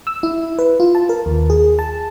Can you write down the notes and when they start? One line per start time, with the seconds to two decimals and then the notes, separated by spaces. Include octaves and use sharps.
0.07 E6
0.23 E4
0.59 B4
0.80 F4
0.95 A5
1.09 A#4
1.26 D#2
1.50 G#4
1.79 A5